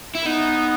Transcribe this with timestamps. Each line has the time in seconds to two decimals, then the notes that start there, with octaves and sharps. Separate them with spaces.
0.15 E4
0.26 B3 D#4